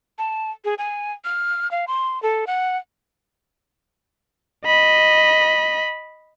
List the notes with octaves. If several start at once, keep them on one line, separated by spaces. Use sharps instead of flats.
A5
G#4
G#5
F6
F5
C6
A4
F#5
D#5 B5